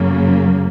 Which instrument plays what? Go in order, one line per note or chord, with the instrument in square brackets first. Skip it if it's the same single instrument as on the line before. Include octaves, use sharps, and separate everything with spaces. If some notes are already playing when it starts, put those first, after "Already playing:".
Already playing: [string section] F#2 C#3 F#3 A#3